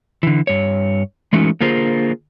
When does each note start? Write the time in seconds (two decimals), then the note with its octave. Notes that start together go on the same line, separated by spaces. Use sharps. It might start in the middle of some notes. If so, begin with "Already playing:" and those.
0.23 D3 E3
0.47 G2 C#5
1.33 E3 G#3 A3 C#4 D#4 F#4
1.61 D3 A#3 F4 G#4 A#4 C5